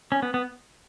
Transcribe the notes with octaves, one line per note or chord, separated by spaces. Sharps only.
C#4
B3
B3